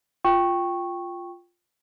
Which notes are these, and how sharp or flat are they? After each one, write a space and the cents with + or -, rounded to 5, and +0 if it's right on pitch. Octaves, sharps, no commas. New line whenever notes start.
F4 +0 G5 +0 C#6 -10